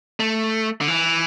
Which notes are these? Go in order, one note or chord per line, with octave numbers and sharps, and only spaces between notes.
A3
D3
E3